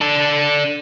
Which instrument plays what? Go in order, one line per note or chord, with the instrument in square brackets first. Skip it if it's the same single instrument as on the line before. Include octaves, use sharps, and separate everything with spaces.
[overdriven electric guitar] D4 A4